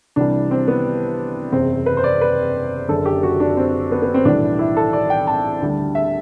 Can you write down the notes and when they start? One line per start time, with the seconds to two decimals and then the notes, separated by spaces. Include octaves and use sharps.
0.16 C2 C3 E3 G3 D4
0.51 C4
0.68 B3
1.52 F#1 E2 C3 C4
1.86 B4
1.97 C5
2.04 D5
2.21 B4
2.88 F#1 F#2 D3 A4
3.06 G4
3.23 F#4
3.40 D4
3.57 C4
3.92 B3
4.02 B3
4.14 C4
4.25 B1 A2 E3 G3 D4
4.59 E4
4.77 A4
4.93 D5
5.10 G5
5.27 A5
5.61 D2 D3 G3
5.95 E5